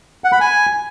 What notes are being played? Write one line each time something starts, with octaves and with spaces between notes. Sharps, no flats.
F#5
B5
G#5